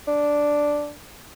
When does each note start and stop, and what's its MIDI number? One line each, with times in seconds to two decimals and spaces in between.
0.07 0.91 62